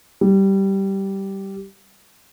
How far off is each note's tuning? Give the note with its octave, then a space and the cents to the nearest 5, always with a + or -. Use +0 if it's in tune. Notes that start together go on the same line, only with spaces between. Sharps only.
G3 -10